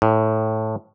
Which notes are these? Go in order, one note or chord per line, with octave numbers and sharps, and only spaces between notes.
A2